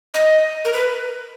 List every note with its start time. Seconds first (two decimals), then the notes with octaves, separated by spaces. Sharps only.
0.14 D#5
0.65 A#4
0.73 B4